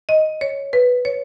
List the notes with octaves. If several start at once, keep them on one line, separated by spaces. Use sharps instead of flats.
D#5
C#5
B4
C#5